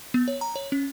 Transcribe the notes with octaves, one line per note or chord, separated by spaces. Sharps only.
B3
C#5
A#5
C#5
C#4